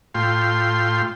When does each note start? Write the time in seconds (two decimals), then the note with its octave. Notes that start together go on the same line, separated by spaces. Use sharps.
0.14 A2 F4 G5 C6